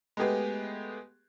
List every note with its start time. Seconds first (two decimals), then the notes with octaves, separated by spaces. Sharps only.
0.17 G#3 A3 B3 G4 G#4 B4